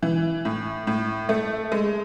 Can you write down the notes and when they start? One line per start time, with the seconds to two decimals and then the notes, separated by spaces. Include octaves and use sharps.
0.03 E3
0.45 A2
0.87 A2
1.29 A3
1.72 G#3